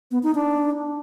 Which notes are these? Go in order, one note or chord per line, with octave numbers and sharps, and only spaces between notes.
B3
D#4
D4